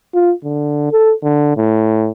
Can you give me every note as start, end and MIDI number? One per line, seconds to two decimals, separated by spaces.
0.14 0.32 65
0.44 0.89 50
0.92 1.13 69
1.24 1.52 50
1.57 2.11 45